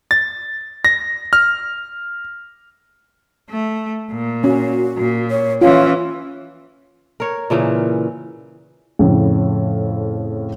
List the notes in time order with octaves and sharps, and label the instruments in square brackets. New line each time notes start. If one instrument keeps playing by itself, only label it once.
[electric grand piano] A6
A#6
F6
[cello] A3
A#2
[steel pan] C#4 [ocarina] F#4
[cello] A#2
[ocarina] C#5
[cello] E3 C#4 [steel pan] F4 [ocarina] C#5
[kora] A#4 C#5
A#2 C#3 E3 C#4
[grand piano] F2 A2 C#3